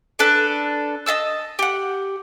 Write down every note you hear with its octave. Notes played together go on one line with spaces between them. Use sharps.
D4 A4 B4
D#5 F5 A5 E6
G4 F#5